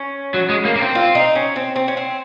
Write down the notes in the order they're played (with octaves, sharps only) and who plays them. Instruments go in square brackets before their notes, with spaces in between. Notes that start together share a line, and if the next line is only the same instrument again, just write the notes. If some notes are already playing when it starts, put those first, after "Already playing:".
Already playing: [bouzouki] C#4
[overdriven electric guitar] F#3
G#3
A#3
A#3
C4
[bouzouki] F4
D#4
C#4
C4
C4
C#4
C4